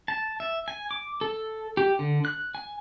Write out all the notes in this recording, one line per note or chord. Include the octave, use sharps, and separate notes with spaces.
A5
E5
G#5
D6
A4
G4
D3
F#6
G#5